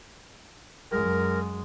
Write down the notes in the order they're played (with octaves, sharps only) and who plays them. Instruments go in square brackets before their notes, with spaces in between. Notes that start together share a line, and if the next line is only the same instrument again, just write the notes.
[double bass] F#2 G#3 [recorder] A#4